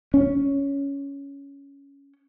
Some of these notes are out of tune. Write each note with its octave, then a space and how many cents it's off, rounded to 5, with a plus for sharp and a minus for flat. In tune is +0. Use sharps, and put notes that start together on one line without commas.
C#4 +10